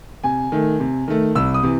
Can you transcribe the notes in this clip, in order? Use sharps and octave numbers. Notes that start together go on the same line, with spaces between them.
C3 G#5
D#3 A3
C3
D#3 A3
C2 E6
D#6
C3 E3